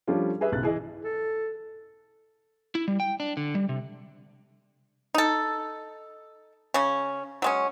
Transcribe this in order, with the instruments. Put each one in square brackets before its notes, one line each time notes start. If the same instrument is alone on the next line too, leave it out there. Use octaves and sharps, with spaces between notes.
[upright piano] F3 G3 A3 C#4 D4 F4
G4 G#4 B4 E5
B1 C#3 F#6 A6
E3 G#4 D#5
[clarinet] A4
[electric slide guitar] E4
G3
G5
D4
D3
G3
C3
[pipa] D#4 A4
C#3 C#4
F#3 G#3 C#4